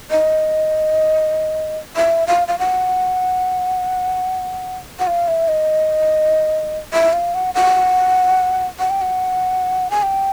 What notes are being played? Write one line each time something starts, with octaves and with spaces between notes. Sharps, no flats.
D#5
E5
F5
F5
F#5
F#5
F5
E5
D#5
E5
F5
F#5
F#5
F#5
G5
F#5
G#5
G5